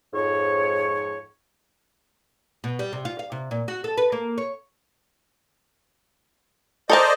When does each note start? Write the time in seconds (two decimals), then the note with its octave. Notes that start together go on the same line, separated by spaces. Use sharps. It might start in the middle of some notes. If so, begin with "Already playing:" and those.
0.13 F2 G#2 C#5
2.64 B2
2.79 G3
2.93 C3
3.05 F4
3.19 F5
3.32 C3
3.51 A#2
3.68 F#4
3.84 A4
3.98 B4
4.12 A#3
4.38 C#5
6.90 A4 A#4 C5 D5 D#5 A5